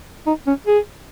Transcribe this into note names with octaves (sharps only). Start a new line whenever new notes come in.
D#4
C#4
G#4